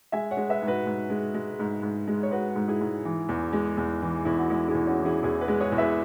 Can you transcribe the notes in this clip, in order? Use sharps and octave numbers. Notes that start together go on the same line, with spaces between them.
G#3 E5 G#5
C#5 F#5
G#3
B4 E5
G#2
F#4 B4
G#2
G#3
G#3
G#2
G#2
G#3
C#5
G#3 F#4 B4
G#2
E4 G#4
G#2
E3
E2
G#3
E2
E3
E2 E4
F#4
G#3 E4 G#4
E4 G#4
E2
C#4 F#4
E3
E4 G#4
E2 E4 G#4
F#4 B4
G#3
G#4 C#5
E2
B4 E5